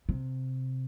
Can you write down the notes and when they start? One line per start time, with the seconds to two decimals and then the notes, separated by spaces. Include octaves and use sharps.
0.09 C3